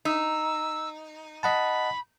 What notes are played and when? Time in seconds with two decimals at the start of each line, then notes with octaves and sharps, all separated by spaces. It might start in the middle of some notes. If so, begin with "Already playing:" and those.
0.05 D#4 E6
1.43 D#5 F#5 A5 B5